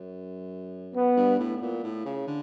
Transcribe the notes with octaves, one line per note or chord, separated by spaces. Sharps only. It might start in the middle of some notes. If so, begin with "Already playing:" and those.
Already playing: F#2
B3
G2
A2
A2
A#2
A2
C#3
D3